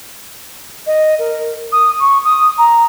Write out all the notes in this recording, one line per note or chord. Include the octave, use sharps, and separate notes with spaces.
D#5
A#4
D#6
C#6
D#6
A#5